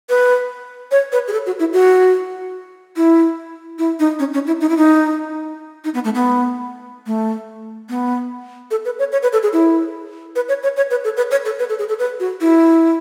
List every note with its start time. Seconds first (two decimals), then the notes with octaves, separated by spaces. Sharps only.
0.09 B4
0.91 C#5
1.12 B4
1.28 G#4
1.33 A4
1.46 F#4
1.60 E4
1.73 F#4
2.97 E4
3.79 E4
3.99 D#4
4.19 C#4
4.34 C#4
4.47 E4
4.61 D#4
4.69 E4
4.77 D#4
5.84 D#4
5.94 B3
6.04 A3
6.15 B3
7.07 A3
7.89 B3
8.71 A4
8.85 B4
8.99 C#5
9.12 C#5
9.23 B4
9.33 A4
9.43 G#4
9.53 E4
10.36 B4
10.49 C#5
10.63 C#5
10.77 C#5
10.91 B4
11.04 A4
11.17 B4
11.31 C#5
11.45 A4
11.59 B4
11.69 A4
11.79 G#4
11.89 A4
11.99 B4
12.20 F#4
12.41 E4